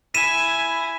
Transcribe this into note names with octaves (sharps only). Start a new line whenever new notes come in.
E4 G#5 B6 D#7 E7